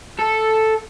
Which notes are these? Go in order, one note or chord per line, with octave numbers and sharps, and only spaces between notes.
A4